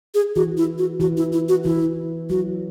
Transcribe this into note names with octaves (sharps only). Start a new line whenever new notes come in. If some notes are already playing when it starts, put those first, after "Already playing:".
G#4
E3 F#4
E4
F#4
E3 F#4
E4
E4
F#4
E3 E4
F#3 F#4